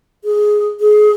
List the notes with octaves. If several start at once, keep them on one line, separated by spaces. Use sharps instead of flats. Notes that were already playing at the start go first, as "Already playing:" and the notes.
G#4
G#4